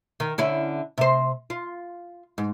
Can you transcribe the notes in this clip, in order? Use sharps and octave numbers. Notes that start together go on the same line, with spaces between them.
D#3
D3 C#4 E4
C3 C5
F4
G#2